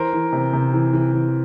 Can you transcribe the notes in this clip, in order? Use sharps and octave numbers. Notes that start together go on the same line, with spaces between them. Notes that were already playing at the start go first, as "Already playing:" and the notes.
Already playing: E3 A#4 C5
E3
C3
C3
E3
E3
E3